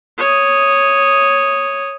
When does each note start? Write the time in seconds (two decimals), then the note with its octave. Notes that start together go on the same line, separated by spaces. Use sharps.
0.18 C#5 D#6